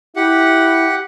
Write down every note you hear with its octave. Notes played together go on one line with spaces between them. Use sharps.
E4 G4 F#5